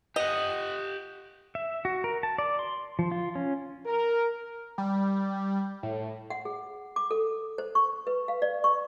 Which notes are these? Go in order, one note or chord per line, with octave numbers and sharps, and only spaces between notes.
G4 D#5 F#5
E5
F#4
A#4
A5
D5
C6
F3
F4
C#4
A#4
G3
A2
F#5
G#4
D6
A4
C5
C#6
B4
F5
D5
C#6